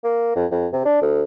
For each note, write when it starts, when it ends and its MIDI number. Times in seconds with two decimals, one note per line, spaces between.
0.04 0.33 58
0.36 0.45 41
0.51 0.66 41
0.73 0.82 48
0.85 0.97 62
1.02 1.23 38